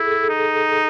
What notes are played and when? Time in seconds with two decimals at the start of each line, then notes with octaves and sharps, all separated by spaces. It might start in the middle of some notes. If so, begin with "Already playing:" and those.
Already playing: E4 G#4 A4
0.11 A4
0.29 D#4